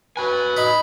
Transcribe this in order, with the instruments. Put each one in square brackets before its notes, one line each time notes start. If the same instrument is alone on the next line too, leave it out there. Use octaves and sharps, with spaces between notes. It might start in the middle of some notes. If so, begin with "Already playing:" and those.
[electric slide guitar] F#4 G#5 [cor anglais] B4
[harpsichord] D#4 [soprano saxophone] B5